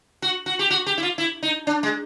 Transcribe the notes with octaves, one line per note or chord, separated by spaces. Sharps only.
F#4
F#4
G4
F#4
G4
E4
F4
E4
D#4
D4
G#3